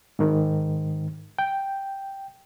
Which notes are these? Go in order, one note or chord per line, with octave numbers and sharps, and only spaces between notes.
G#2 D#3
G5